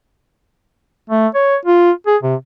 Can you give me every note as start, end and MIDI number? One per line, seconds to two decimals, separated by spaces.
1.10 1.27 57
1.35 1.56 73
1.65 1.91 65
2.07 2.17 68
2.23 2.35 48